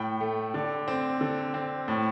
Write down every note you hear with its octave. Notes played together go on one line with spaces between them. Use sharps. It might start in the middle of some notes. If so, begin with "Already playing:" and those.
Already playing: A2 G5
A3
D3
C4
D3
C4
A2